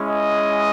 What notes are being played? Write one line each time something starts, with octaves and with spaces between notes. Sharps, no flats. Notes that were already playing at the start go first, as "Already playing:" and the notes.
Already playing: G#3 C#4 E4
D#5